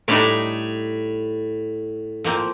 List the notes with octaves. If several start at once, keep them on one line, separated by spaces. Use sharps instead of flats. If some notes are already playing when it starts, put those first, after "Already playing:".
A2 G3 D4 D#4
F3 A#3 C4